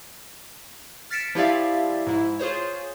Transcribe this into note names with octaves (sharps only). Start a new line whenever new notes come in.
F6 A6 B6 C#7 D7 E7
F3 E4 G4 D5 E5 F5
G#2 E4
F4 G#4 C5 C#5